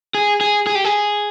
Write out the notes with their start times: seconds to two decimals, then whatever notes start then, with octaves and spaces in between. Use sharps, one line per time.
0.15 G#4
0.41 G#4
0.67 G#4
0.75 G4
0.85 G#4